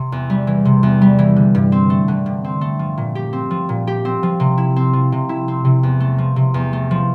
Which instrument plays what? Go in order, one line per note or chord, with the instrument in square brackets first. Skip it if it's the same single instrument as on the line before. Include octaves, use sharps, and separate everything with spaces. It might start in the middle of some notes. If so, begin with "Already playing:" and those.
Already playing: [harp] C3
E2
G3
E3
C3
E2
G3
E3
D3
G2
C4
A3
D3
G2
C4
A3
F3
A#2
G4
C4
F3
A#2
G4
C4
F3
C3
E4
C4
F3
C3
E4
C4
C3
E2
A3
F3
C3
E2
A3
F3